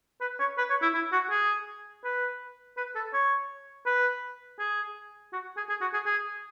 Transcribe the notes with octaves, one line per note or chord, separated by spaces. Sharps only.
B4
C#5
B4
C#5
E4
E4
F#4
G#4
B4
B4
A4
C#5
B4
G#4
F#4
G#4
G#4
F#4
G#4
G#4